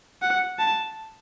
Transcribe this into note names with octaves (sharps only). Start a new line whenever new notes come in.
F#5
A5